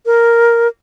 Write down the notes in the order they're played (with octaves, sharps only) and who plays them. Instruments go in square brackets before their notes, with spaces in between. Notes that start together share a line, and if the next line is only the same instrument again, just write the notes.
[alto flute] A#4